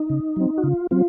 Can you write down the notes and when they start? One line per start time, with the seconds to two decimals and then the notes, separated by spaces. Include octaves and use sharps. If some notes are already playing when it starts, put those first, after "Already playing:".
Already playing: D#4
0.10 C#3
0.36 F#3 C4
0.58 F#4
0.63 C#3 F4
0.91 F#3 C4 F4